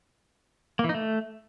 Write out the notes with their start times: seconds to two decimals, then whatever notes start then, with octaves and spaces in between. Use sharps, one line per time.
0.79 A#3
0.84 E3
0.89 D#4
0.94 A3